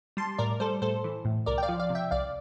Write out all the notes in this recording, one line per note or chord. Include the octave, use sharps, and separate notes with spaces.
G3 A5 C6
A2 A#4 D5
G3 A4 C5
A2 A4 C5
E3
A2
C2 A#4 D5
G5
D5 F5
F3
D5 F5
C3
E5 G5
C2 D5 F5